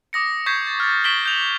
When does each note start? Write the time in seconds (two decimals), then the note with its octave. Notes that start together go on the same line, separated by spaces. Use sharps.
0.13 D6 D#6 A#6 C#7
0.46 C#6 G6 G#6 B6 C7
0.67 A6
0.80 F6 A6
1.04 C#6 B6 D7 E7 F#7 G7
1.25 G6 F7 F#7